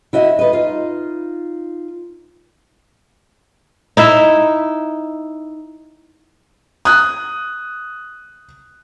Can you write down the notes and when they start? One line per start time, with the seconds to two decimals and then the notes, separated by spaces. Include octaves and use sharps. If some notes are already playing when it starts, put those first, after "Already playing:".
0.13 E4 F#4 D#5 E5
0.39 B4 D#5
0.53 D#4 F4
3.97 D#4 E4 E5
6.85 D#6 F#6